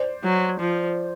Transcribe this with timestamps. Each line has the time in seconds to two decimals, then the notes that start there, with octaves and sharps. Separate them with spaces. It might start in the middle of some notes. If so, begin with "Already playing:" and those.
Already playing: C5 D5
0.23 F#3
0.59 F3